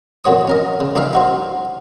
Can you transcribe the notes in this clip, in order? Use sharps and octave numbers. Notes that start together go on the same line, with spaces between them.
F2 A#2 F#4 C#5 D#6
C#4 A#4 D#5
C#3
B1 D4 D#4 E5 F5
D#4 F#4 C5